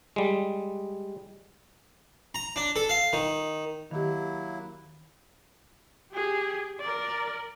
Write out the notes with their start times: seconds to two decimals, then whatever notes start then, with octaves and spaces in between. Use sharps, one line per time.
0.16 G3 G#3
2.35 A#5
2.56 D4
2.76 A4
2.89 F5
3.13 D#3
3.91 D#3 F#3 A#3 E4 G4
6.12 G4 G#4
6.81 A#4 D5